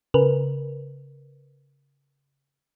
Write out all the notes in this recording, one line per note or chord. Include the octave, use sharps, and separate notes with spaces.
C#3 A#4 B4